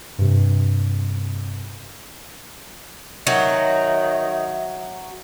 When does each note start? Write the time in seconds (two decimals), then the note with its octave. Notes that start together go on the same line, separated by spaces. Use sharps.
0.18 G2 C3
3.27 D#3 F#3 E5